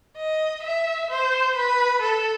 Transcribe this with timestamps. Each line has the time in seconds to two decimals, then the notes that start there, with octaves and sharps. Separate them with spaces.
0.17 D#5
0.63 E5
1.11 C5
1.57 B4
2.03 A4